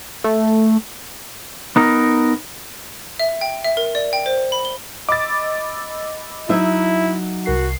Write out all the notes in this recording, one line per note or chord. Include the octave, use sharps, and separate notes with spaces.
A3
B3 D#4 A#4
E5
G5
E5
A#4
D5
G5
C5
B5
G7
D#5 B5 D6 E6 A6
F#3 D#4 E4 E5
C2 F#4 A#4 C7